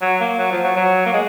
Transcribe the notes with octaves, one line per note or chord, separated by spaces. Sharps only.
F#3
A#3
F#3
F3
F#3
F#3
A#3
G#3